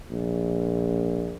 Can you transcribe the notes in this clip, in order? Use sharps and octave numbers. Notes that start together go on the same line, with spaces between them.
A#1